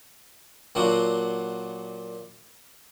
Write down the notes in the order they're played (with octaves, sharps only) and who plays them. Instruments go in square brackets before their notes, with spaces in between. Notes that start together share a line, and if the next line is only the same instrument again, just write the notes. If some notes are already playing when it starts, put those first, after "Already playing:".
[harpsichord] A#2 F#3 D4 F4 F#4